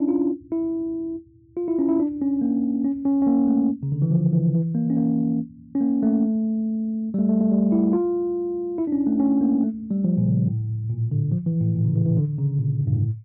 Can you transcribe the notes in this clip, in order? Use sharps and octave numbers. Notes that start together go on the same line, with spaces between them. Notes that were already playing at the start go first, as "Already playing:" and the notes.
Already playing: C#4 D4 E4
F4
E4
F4
E4
C#4
E4
D4
C#4
A#3
C#4
C#4
C#4
A#3
A3
C#3
D3
E3
F3
E3
E3
A#3
C#4
A#3
C#4
A#3
A3
G3
A3
A3
A3
G3
E4
F4
E4
D4
C#4
A3
C#4
A#3
A3
G3
F3
A#2
C#3
A2
A#2
D3
F3
E3
A2
A#2
C#3
E3
E3
D3
C#3
A#2
A2
G2
A2